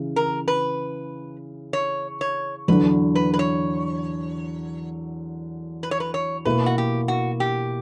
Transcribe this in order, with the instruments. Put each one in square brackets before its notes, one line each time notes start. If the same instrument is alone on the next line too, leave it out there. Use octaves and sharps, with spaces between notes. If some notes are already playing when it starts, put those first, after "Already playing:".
Already playing: [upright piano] C#3 E3
[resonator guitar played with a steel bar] A#4
B4
C#5
C#5
[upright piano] E2 D3 F#3 [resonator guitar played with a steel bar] B4
[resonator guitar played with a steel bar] B4
B4
C#5
B4
C#5
B4
C#5
[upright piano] B2 A#3 E4 [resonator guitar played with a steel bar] B4
[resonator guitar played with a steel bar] F#4
G4
F#4
G4